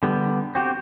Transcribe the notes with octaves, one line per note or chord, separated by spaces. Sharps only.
D3 G3 B3
C4 F#4 G4